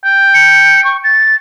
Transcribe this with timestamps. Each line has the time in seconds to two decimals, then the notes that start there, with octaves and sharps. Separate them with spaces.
0.05 G5
0.34 C#7
0.85 C#6
1.04 A6